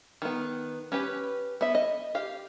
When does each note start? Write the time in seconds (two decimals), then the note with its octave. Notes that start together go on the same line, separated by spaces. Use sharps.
0.22 D#3 B3
0.92 C#4 G4 B4
1.61 B3 E5
1.75 D#5
2.15 G4 F5